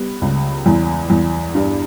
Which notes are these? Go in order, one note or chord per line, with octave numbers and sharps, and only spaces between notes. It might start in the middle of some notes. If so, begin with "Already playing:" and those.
Already playing: G3 B3
C#2
E2
E2
G2